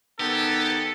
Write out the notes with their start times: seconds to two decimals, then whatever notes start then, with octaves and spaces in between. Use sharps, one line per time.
0.20 D#3 B3 G4 A4